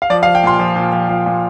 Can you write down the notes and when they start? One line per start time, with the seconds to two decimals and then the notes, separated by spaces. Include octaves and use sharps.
0.02 F5
0.10 F3 D5
0.23 F5
0.26 F3
0.35 G5
0.43 A#2 C6
0.59 F3
0.76 A#2
0.93 F3
1.09 F3
1.26 A#2